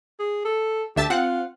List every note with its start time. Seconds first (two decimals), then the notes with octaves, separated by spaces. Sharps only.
0.20 G#4
0.45 A4
0.96 D2 G4 E5 A5
1.10 C4 F4 F#5